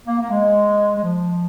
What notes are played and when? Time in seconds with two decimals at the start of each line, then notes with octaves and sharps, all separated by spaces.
0.06 A#3
0.20 A#3
0.30 G#3
0.95 G#3
1.04 F3